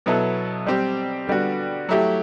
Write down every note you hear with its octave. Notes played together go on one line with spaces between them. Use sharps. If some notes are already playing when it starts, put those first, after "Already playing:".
B2 F#3 B3 E4 A4
G3 C4 G4
D3 G3 B3 F#4
F#3 A3 E4 G4